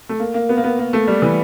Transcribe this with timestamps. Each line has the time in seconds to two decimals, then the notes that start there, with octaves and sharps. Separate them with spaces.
0.09 A3
0.20 A#3
0.34 A#3
0.49 B3
0.57 A#3
0.64 B3
0.79 A#3
0.93 A3
1.07 G3
1.22 E3